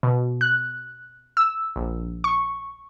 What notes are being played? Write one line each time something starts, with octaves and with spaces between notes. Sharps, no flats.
B2
F#6
E6
A#1
C#6